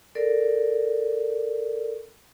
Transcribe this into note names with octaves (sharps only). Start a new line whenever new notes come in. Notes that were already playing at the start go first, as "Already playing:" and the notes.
A4 A#4 D5